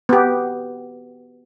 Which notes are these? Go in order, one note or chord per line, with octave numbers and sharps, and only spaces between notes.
B3 G4